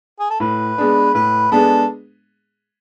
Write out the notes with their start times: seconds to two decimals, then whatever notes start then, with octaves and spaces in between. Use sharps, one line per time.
0.19 G#4
0.30 A4
0.40 A2 B4
0.78 G#3 B3 D4 G#4
1.14 A2 B4
1.52 G#3 B3 D4 G#4 A4